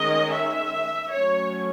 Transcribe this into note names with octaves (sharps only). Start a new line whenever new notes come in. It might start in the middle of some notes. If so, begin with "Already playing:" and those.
Already playing: D#3 G#3 C#4 D#5
E5
F#3 A3 C#4 C#5